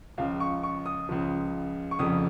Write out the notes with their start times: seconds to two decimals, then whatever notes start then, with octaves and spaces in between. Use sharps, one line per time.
0.18 C#2 C#3 F3 F5
0.40 C#6
0.63 C#6
0.86 D#6
1.09 C#2 C#3 F3
1.91 C#6
1.99 F1 F2 C#3 D#6